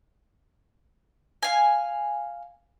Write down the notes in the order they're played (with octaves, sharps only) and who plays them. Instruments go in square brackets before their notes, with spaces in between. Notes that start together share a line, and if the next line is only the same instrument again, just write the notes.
[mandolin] F5 G#5